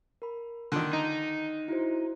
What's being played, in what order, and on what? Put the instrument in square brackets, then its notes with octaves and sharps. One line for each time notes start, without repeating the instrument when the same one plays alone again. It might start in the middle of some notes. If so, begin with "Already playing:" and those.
[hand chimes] A#4 B5
[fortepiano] D3 D#3 [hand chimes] C6 D7
[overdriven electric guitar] D#4 [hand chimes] A#5
[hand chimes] E4 F#4 C5